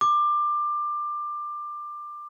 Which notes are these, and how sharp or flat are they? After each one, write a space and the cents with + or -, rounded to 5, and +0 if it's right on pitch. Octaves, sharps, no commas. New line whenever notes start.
D6 +20